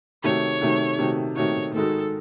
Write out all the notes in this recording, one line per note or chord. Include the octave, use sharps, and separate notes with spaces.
C3 D#3 A3 D#4 F#4 C#5
C3 D#3 A3 D#4 F#4
C3 D#3 A3 D#4 F#4
C3 D#3 A3 D#4 F#4 C#5
G#2 D#3 G#3 D#4 F#4 A4